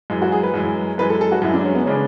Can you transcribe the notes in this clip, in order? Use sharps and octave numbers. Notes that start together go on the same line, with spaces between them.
F#2 E3 G#3
F#4
G#4
B4
F#2 E3 G#3
F#2 E3 G#3 B4
A4
A4
F#4
F#2 E3 G#3 E4
D4
C#4
B3
C#3 G#3 B3 C#4 D4